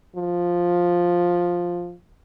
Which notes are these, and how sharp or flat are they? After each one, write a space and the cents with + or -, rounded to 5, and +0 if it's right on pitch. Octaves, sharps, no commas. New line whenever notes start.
F3 +5